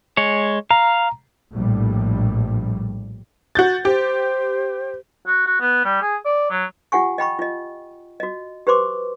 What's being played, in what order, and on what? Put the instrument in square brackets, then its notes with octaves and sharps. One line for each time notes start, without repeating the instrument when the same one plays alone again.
[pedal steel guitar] G#3 C#5
[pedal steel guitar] F5 [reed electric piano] A#5
[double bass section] A#1 A2 G3
[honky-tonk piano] F#4 G6 A6
[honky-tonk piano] G4 [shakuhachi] C5
[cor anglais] F#4
F#4
B3
G3
G#4
D5
F#3
[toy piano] F4 G4 F#5 G#5 C#6
D#5 G5 B5 C#6
F4 D#5
F#4 D#5
G4 B4 C5 C6 D6